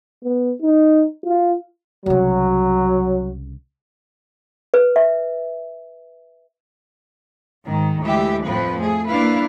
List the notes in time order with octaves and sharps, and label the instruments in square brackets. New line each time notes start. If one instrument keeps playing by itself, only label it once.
[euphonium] B3
D#4
F4
[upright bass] C2 C#3 [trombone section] F#3
[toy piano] B4
E5
[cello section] G#2 D#3
D2 E3 G#3 G4 E5
F2 A2 F3 C4 B4
A3 G#4
A#3 D4 E4 B4 F5